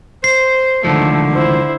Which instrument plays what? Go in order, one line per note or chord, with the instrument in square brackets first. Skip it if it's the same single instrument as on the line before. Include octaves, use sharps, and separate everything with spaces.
[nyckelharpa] C5 [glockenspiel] C7
[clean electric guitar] C#2 D#3 F3 [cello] D3 [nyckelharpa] A3
[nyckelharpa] E4 C5